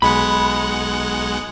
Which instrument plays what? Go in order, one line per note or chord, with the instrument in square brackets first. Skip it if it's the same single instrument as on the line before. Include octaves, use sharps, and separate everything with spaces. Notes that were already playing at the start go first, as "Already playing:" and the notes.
[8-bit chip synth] B1 G#3 F#5 [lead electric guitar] B5